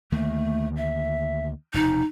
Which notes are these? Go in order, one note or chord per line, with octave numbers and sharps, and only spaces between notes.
D2 D#3 A3 A#3
E5
F1 E2 B2 D#4